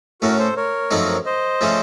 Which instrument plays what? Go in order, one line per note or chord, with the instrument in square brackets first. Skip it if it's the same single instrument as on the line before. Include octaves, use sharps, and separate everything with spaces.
[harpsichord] A2 A3 C#4 [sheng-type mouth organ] F#4 A#4
[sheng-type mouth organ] A4 C5
A#4 C#5
[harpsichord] F#2 F3 A3 C4 D#4
[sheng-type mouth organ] C5 D#5
[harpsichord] C#3 F3 A3 C#4